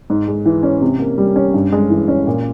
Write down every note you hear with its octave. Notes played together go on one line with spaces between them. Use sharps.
G#2
G#3
E3
C#4
C3
A#3
G3
C#4
G2
G#3
E3
C#4
A#2